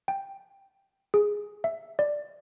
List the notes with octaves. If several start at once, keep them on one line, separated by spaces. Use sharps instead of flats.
G5
G#4
E5
D5